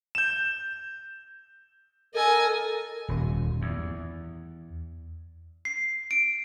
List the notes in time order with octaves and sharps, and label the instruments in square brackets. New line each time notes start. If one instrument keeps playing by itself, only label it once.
[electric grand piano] G6 E7
[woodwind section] A4 A#4 [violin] D#5 G#5
[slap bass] D#1
E2
[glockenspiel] C7
D7